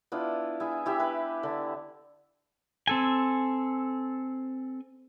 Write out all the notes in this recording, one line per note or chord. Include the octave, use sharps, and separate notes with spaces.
B3 D4 E4 F4
E4 G#4
E4 G4 E5
B4
D3
C4 A4 G#5